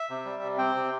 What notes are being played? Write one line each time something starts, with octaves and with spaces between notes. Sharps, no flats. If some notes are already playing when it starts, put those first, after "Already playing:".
Already playing: E5
C3
G3
C3
C4 G5
C3